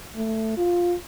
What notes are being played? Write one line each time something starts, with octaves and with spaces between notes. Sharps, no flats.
A3
F4